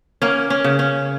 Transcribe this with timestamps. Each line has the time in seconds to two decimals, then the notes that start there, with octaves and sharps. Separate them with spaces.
0.22 A#3 C#4
0.50 C#4
0.64 C#3
0.79 C#4